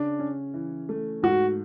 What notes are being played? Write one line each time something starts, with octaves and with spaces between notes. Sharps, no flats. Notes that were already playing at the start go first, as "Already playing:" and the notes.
Already playing: C#3 D4
C#4
E3
A3
G#2 F#4